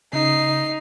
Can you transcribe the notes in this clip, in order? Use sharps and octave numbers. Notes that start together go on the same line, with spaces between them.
C#3 D#4 C7